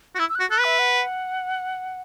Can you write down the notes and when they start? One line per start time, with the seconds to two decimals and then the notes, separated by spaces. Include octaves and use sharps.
0.15 F#4
0.19 E4 E6
0.29 E6
0.35 F#4 F#6
0.50 A4 F#6
0.60 B4 E5
0.79 F#5